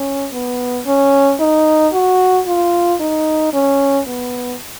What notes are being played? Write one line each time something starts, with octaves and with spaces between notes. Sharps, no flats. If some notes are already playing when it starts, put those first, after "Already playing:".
Already playing: C#4
B3
C#4
D#4
F#4
F4
D#4
C#4
B3